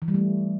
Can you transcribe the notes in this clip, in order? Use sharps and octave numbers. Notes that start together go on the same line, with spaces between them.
E3
G3
A3